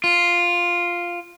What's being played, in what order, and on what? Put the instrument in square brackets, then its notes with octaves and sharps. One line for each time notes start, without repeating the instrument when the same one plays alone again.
[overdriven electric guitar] F4